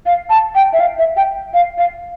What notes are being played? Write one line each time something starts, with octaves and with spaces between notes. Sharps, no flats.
F5
A5
G5
E5
F5
E5
G5
F5
F5